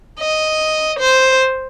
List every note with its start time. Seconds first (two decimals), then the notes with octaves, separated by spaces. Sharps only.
0.19 D#5
1.00 C5